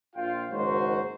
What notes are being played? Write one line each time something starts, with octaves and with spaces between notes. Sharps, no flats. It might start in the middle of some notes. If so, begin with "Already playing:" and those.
A#1 F4 F5 G5
F#1 G#2 D#3 F#3 F#4 C5